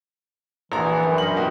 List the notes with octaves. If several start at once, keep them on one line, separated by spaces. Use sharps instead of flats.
A#1 D3 E3 F#4 G#4 A#5
F#5 A5
F#2 B2 G3 C5
D#4 A#4 G5 F#7
B2 F#4 G4